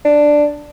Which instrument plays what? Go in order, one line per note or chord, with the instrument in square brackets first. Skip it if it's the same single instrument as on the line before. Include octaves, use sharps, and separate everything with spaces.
[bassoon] D4